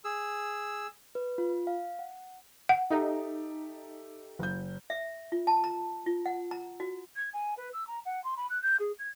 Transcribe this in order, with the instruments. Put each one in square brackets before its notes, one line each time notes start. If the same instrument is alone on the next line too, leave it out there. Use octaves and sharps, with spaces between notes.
[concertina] G#4 E6
[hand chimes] B4
F4
F5
F#5
[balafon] F#5
[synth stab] D#4 [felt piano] G4 A4 E5
[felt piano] F#1 G6
[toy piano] E5
F4
A5
A#5
F4
F#5
A#5
F#4
[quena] G#6
G#5
B4
E6
A#5
F#5
C6
B5
F#6
G6
G#4
G#6